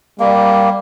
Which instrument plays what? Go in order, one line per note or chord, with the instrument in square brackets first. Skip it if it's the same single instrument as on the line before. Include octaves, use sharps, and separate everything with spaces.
[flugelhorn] G3 [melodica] A#3